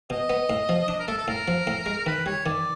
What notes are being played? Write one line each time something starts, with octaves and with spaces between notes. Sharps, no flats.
B2 D#5
B3
A2
F3
D4 D#5
A#4
A3 A4
A4
A2 A#4
F3
A2
G#3
D#3 B4
G3 C#5
D#3 D5